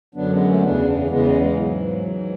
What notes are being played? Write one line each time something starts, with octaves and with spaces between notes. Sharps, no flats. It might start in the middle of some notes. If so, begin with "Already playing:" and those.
F#2 D3 F#3 B3 D4
G#3 B3
A3 C#4
E2 C#3 E3 B3 D4
E2 C#3 E3 G#3 B3
G#3
G#3
G#2 E3 F#3
G#2 E3